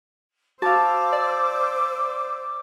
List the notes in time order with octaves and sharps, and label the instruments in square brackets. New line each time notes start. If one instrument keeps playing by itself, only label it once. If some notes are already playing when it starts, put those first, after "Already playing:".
[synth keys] F#4 [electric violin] C5 [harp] F5 A5 [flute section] D6 E6
[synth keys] D5